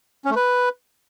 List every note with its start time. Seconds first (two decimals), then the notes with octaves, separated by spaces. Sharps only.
0.25 C#4
0.30 A3
0.36 B4